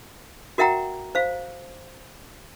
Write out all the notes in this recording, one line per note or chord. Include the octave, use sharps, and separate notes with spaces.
F#4 A#4 E5 F#5 G5 A#5
C5 F5